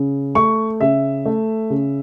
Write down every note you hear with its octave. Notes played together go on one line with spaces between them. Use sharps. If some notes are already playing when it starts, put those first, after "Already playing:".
Already playing: C#3
A3 C#6
C#3 E5
A3
C#3